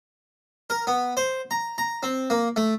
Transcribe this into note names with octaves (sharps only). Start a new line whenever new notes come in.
A#4
B3
C5
A#5
A#5
C4
A#3
A3